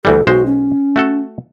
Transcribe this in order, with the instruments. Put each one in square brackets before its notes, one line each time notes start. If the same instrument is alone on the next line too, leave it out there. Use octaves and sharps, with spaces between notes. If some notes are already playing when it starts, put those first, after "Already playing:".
[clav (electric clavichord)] D2 E3 G3 [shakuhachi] A4
[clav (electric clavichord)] B1 G#3 C5 [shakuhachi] F#4
[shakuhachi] C#4
[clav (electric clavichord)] A3 F#4 A4